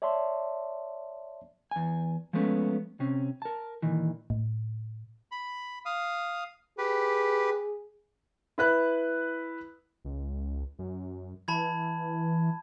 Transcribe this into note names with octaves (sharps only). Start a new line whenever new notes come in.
C#5 D5 E5 A5 C6
E2 G#5
F3 G#3 A3 B3 C#4
C3 C4 C#4
A#4 A5
A#2 D#3 E3
A2
B5
F5 D#6
G4 G#4 B4
E4 B4 F#6
C#2
F#2
E3 A5 B5 G#6